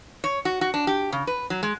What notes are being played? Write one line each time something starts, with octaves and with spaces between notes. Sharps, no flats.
C#5
F#4
F#4
D4
G4
C#3
B4
F#3
G#3